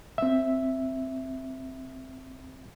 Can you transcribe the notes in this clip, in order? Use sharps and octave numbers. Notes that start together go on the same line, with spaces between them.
C4 E5